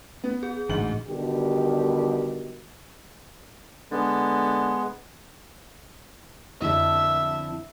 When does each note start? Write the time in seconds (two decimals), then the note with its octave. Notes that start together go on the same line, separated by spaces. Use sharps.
0.24 B3
0.43 G#4
0.69 A1 D2 G#2 F#7
1.08 B2 D3 D#3 G3 G4
3.92 D3 G#3 B3
6.62 F2 D3 E4 E5